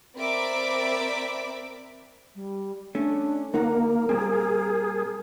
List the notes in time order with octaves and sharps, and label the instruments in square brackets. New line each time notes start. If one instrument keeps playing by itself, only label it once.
[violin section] C4 A#4 D5 E5 B5 D6
[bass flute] G3
[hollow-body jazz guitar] A3 C#4 [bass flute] D4
[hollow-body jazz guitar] D2 D#4 F#5 [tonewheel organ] A#3 [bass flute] A#4
[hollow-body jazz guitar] A#2 G3 C4 [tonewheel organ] G#4